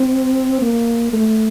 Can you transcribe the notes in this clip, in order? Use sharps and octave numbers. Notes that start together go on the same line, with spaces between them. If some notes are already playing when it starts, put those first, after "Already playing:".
Already playing: C4
A#3
A3